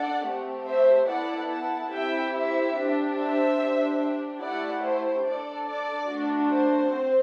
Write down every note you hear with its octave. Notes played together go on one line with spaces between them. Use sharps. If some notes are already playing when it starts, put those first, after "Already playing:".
Already playing: D4 A4 D5 F#5
A3 C4 G4
C5 E5
B3 E4 A4 D5 F#5
F#5 A5
C4 E4 G4 E5 G5
C5 E5
D4 G4
C5 E5
D4 G4
A3 E4 G4 D5 F#5
C5
D4 A4 D5
D5
A3 D4 F#4
C5
C4